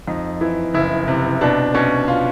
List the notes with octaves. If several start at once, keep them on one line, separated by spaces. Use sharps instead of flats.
F2 D#4
E3 E4
F#1 E4
C3
B2 D4
B2 C#4
F4